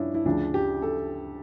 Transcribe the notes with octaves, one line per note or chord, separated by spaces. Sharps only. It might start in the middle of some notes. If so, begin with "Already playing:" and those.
Already playing: G2 C#4 D4 E4 F4
E4
D2 C#3 F3 D4
G4
A4